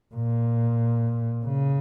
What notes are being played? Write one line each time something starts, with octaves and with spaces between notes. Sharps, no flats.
A#2
C#3